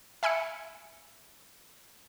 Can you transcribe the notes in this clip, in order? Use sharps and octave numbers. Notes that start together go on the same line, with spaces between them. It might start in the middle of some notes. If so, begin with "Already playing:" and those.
E5 G#5 B5 E6 C#7